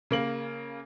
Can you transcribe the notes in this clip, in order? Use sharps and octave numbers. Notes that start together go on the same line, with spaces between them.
C#3 A#3 F#7